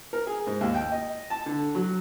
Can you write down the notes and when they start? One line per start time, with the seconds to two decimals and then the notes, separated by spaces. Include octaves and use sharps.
0.13 A#4
0.27 G#4
0.47 G#2
0.61 D#2
0.74 G5
0.92 D#5
1.30 A5
1.46 D3
1.75 F#3